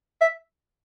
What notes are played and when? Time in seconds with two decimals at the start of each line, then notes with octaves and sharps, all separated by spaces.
0.21 E5